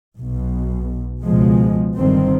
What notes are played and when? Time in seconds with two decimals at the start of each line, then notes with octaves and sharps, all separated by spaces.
0.17 B1 B2
1.23 C#2 B2 F3 G#3
1.97 G1 G2 D3 D#3 C4